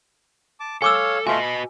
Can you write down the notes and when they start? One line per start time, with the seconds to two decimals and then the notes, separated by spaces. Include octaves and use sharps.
0.60 A5 D6
0.82 A4 C#5 F5 G#5 D6 E6
1.27 A3 F4 F#4 B4 D#5 G#5
1.42 B5